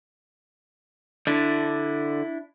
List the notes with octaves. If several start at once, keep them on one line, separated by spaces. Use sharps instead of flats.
D3 D4 E4